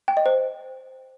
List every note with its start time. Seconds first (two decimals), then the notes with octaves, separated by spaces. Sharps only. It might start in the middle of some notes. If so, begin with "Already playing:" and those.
0.08 G5
0.17 D#5
0.26 C5